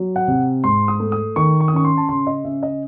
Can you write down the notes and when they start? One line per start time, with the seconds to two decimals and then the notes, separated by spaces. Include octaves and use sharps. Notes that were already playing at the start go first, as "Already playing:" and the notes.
Already playing: F#3
0.16 F#5
0.28 C3
0.64 G#2 C6
0.88 D#6
1.00 A3
1.12 D#6
1.36 D#3 C#6
1.60 C#6
1.68 D#6
1.73 C#4 C#6
1.85 C6
1.97 A5
2.09 C#3 C6
2.27 D#5
2.44 C#4 E5
2.63 D#5